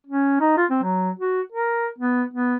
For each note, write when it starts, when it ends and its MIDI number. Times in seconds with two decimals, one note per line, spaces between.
0.07 0.37 61
0.40 0.56 63
0.57 0.65 65
0.70 0.79 60
0.83 1.10 54
1.19 1.41 66
1.52 1.87 70
1.98 2.24 59
2.33 2.56 59